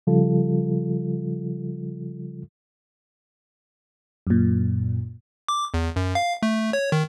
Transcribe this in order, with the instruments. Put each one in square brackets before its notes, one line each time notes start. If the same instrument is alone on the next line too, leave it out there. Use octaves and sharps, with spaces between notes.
[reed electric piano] C#3 F3 G3 F4 A4
[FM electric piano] F#2 A#2
[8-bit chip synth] D6
E2
F#2
F5
A3
C#5
D#3